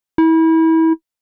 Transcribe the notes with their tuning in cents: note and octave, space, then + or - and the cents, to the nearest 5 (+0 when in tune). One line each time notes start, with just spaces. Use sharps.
E4 -30